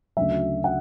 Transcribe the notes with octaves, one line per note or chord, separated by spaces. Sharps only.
D2 C#3 F#3 E5
F#5